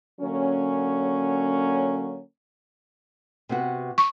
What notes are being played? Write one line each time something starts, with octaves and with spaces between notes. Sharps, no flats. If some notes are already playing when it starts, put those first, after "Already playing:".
D3 F#3 A#3 C#4
C3 B3 F#4
C#6